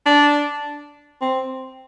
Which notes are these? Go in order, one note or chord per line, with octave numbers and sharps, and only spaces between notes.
D4
C4